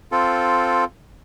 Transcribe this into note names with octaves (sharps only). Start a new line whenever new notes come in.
C4 F4 A4